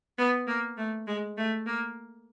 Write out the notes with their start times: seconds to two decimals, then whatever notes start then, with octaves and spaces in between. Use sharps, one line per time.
0.18 B3
0.47 A#3
0.78 A3
1.07 G#3
1.37 A3
1.66 A#3